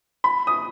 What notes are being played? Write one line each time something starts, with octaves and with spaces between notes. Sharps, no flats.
B5
D#6